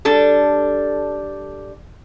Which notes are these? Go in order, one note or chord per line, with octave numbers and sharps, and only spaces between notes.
G3 D4 A4